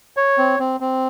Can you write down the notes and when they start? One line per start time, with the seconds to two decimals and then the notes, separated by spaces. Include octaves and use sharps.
0.17 C#5
0.38 C4
0.60 C4
0.80 C4